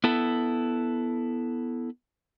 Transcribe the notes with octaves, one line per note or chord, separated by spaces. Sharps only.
B3 E4 A4